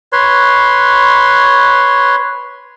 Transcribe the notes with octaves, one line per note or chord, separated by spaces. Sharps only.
B4 C#5 C6